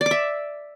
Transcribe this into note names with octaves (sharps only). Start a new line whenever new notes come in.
D5
D6
E5